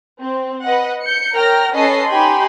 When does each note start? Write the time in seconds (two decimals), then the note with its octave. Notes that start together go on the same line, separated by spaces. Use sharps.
0.22 C4
0.64 B4 D#5 F#5
1.01 G6 C#7
1.34 A#4 C#5 G5 F6 A#6
1.75 C#4 A4 B4 D#5 C7
2.09 D#4 G4 G5 G#5 B5 C6